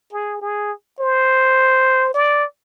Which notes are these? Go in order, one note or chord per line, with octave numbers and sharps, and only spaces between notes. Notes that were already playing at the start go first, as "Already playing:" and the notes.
G#4
G#4
C5
D5